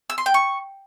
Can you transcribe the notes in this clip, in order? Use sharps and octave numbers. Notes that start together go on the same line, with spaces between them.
E6
C6
G5
C#6